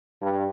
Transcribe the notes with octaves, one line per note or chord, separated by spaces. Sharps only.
G2